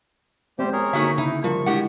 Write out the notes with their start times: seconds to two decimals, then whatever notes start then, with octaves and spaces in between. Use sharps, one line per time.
0.59 G3 G#3 B3 C4 G4 C5
0.73 G#4 A#4 C#5
0.93 D3 A#3 D#4 F#4 E5
1.18 C#3 D#4 E4
1.44 F3 G3 F4 A#4 C#6
1.66 A2 G#3 D4 E4 G4 F#5